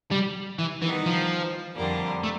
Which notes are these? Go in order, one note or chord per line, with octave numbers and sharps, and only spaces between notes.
G3
E3
D#3 E3 G3 B3 D#4
F3
F2 D3 G3 A#3
A3